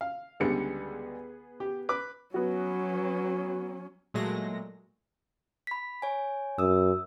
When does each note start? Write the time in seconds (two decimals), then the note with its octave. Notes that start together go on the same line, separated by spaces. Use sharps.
0.01 F5
0.40 C#2 D3 G3 B3 G#4 C#7
1.60 G4
1.89 B4 D6
2.34 F#3 B3 C#4 F#4
4.14 A#2 F#3 G#3 A3 A#6
5.67 B5 B6
6.02 C#5 G#5
6.59 F#2 D#6 E6